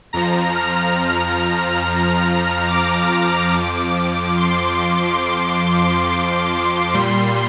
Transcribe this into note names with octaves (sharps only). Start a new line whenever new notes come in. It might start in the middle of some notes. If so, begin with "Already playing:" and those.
F2 F3 A#5
F6
F6
D6
F2 F3
C6
C6
A#2 G3 C6